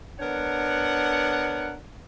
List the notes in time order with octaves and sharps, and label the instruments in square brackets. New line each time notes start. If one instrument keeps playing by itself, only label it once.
[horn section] B3 D4 A#4 C#5 F#5